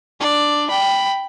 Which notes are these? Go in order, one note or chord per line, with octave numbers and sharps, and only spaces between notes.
D4 D5
G5 B5